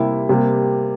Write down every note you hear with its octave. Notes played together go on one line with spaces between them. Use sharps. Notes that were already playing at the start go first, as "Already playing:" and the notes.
Already playing: C3 G3 A#3 E4
C3 G3 A#3